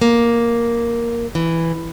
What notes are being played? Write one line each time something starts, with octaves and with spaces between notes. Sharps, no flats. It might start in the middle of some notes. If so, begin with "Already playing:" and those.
A#3
E3